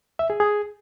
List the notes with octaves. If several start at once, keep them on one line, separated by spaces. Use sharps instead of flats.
E5
G#4
G#4